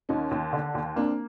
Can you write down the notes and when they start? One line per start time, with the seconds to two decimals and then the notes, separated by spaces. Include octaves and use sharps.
0.09 D#2 C#4 D#4
0.31 D#2
0.53 D3
0.75 D#2
0.96 A#3 C4 D4